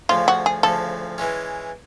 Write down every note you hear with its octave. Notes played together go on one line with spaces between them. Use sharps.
D2 C#3 F3 F4
F#4
G#4
D2 C#3 F3 A4
E3 G#3 C#4